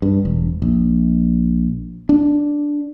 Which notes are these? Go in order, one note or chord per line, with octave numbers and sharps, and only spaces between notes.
G2
E1
A#1
D4